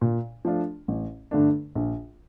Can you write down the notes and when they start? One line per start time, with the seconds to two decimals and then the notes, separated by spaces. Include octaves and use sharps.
0.01 A#2
0.45 F3 A3 D4 F4
0.88 A1
1.31 G2 D3 A3 D4
1.75 A#1